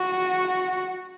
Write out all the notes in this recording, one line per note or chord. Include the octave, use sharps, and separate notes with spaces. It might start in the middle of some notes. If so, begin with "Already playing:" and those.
Already playing: F#4